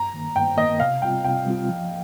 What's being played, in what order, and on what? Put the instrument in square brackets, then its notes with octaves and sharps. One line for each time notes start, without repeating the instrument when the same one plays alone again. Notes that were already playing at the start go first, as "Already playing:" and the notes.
Already playing: [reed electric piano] G2 [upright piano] A#5
[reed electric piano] D#3 A#3
[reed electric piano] G2 [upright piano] G5
[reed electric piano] D#3 A#3 [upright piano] D#5
[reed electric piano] C3 [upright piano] F5
[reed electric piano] G3 C4 F4 [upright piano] G5
[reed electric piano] C3 [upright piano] G5
[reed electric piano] G3 C4 F4
F3